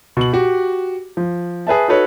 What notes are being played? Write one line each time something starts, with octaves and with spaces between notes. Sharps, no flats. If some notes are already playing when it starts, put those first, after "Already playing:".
B2 F#7
F#4 G4
F3
G#4 B4 E5 A5
D#4 F#4 A4 B4 C#5